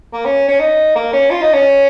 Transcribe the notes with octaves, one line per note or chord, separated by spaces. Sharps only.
A#3
C#4
C#4
D#4
A#3
C#4
F4
D#4
C#4